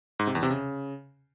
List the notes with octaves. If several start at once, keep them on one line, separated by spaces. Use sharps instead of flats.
G#2
C3
E2
C3
C#3